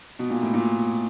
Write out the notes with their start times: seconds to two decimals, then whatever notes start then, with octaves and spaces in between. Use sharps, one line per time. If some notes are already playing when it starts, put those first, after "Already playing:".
0.19 B2
0.30 A#2
0.42 A2
0.54 A#2